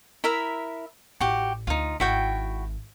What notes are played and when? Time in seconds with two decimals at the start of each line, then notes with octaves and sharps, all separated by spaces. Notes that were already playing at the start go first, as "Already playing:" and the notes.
0.24 E4 A#4 E5
1.20 A1 F#4 G4
1.67 D2 D#4 F4
2.00 G#1 E4 F#4 G5